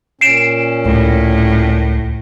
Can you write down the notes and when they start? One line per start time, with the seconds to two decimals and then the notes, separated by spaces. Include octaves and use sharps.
0.21 A#2 C#4 C7 D7 E7
0.85 C#2 A2